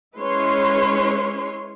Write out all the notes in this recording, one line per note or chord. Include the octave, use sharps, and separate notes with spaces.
G#3 C#4 E4 B4 C#5 C6